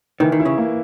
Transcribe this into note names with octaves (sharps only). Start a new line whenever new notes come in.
D#3 E3
D#3
E4
C#3
A#3